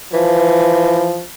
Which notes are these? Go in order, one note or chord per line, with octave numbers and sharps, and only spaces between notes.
E3 F3